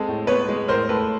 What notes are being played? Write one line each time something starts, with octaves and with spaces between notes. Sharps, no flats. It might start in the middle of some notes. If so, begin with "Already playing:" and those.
Already playing: G#3 C4 A4
A2
B3 B4 C#5
G#3
A2 A#4 C5
A2 A4 B4